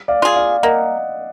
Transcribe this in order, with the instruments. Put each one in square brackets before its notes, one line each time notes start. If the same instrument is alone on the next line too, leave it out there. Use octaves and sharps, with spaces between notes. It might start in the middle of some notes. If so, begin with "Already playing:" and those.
[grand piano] D5 F5
[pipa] F4 G#4
[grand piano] D5 F5
[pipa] A#3 [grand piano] D#5 F#5